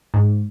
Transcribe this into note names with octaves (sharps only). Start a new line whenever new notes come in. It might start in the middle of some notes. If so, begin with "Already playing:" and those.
G#2